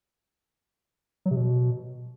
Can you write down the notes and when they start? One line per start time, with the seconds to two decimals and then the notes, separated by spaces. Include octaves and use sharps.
1.26 F#3
1.31 C3
1.36 B2